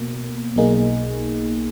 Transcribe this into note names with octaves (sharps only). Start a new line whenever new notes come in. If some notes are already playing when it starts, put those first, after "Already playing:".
Already playing: B2 A#3
B1 B2 A#3 D#4 G#4